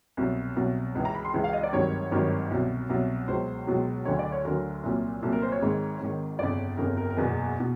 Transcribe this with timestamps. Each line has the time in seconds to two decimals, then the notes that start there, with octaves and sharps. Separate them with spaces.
0.17 C2 B2 F#3
0.56 C2 B2 F#3
0.95 C#2 C#3 E3
1.05 A#5
1.15 B5
1.25 C6
1.34 C#2 C#3 E3
1.44 F5
1.53 D#5
1.63 D5
1.72 G#1 G2 D#3 F#3 C#5
2.11 G#1 G2 D#3 F#3
2.51 C2 B2 F#3
2.90 C2 B2 F#3
3.28 C#2 B2 F#3 C5
3.67 C#2 B2 F#3
4.05 D2 D3 F#3 C#5
4.19 D5
4.32 C#5
4.45 D2 D3 F#3 A#4
4.83 C2 A#2 F#3
5.22 C2 A#2 F#3 A4
5.32 A#4
5.42 C5
5.52 C#5
5.61 G#1 G#2 D#3
6.00 G#1 G#2 D#3
6.39 G1 F2 C#3 D5
6.77 G1 F2 C#3 A#4
6.97 A#4
7.10 A#4
7.16 F#1 E2 B2 B4
7.60 B2